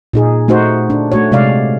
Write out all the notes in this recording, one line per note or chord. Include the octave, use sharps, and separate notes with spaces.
A#2 D#4 G#4
A3 D#4 F#4 C5
D4
A3 F#4 C#5
C3 G#3 D5 F5